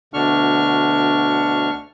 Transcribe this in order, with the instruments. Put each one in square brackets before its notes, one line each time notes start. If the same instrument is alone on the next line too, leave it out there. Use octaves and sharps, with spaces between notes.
[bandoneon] D2 B2 D3 D4 C#6 F6